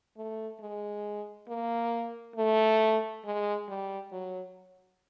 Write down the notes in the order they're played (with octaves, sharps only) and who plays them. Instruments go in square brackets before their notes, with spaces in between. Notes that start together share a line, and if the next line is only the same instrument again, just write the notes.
[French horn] A3
G#3
A#3
A3
G#3
G3
F#3